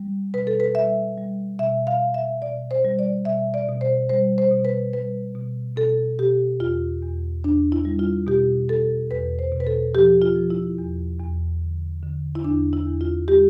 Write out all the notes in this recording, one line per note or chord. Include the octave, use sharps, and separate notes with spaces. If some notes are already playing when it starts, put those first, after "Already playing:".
Already playing: G3
B2 B4
A4
B4
G3 E5
G3
B2 E5
F5
B2
E5
B2 D5
C5
G3
D5
B2 E5
D5
B2
C5
G3 C5
C5
B2
B4
G3 B4
B2
B2 A4
B2 G4
E2 F4
E2
E2 D4
E4
G3
F4
B2 G4
B2 A4
E2 B4
C5
B2
B4
A4
F3 G4
F4
F3
E4
E2
E2
D3
D3
E4
E2 D4
E4
E2
F4
G3 G4